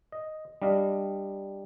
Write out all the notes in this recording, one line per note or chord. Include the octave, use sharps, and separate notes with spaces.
D#5
G3 D4 D#5 F5